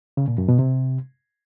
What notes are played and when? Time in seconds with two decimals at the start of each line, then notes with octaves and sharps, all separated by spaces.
0.17 C#3
0.28 A#2
0.38 F#2
0.48 B2
0.59 C3